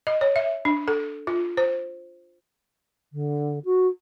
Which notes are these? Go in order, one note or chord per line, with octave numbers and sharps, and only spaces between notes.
D#5
C#5
E5
D4
A4
F4
C5
D3
F#4